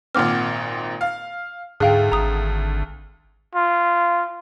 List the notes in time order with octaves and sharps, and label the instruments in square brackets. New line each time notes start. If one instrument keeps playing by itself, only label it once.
[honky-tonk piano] G#1 A#2 C4 [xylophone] F#5 D6 F6
[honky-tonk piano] F5
[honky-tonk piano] D2 [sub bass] G#2 [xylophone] G#4 F5 G5
[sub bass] G#1 [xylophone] A#5 D#6
[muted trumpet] F4